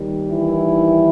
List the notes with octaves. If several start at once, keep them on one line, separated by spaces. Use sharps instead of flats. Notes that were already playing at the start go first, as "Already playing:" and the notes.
Already playing: D#2 D#3 G3
E3 E4